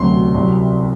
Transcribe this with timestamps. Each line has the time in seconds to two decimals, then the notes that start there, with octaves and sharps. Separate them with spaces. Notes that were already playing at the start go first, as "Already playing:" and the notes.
Already playing: E1 D2 C3 F#3 C6
0.34 C2 C3 F#3